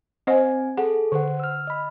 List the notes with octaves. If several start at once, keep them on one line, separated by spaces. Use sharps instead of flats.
C4 C5 D#5 F#5 G#5
G#4 A4 F#5
D3 C5 F#5
E6 F6
D#5 B5